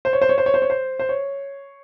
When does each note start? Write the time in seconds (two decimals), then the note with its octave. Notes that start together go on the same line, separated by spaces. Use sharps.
0.05 C5
0.13 C#5
0.21 C5
0.29 C#5
0.38 C5
0.46 C#5
0.54 C5
0.62 C#5
0.70 C5
0.99 C5
1.09 C#5